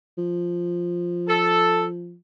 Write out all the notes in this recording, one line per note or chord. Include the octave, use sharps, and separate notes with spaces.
F3
A4